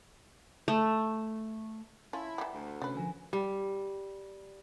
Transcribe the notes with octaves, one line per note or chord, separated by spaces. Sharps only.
A3
C#4 E4 F4 E5 A5
E3 G3 F#5 A#5
D2 F#5
C3 A3 C#4 B4
D3 F3 A#4 G#5 A#6
G3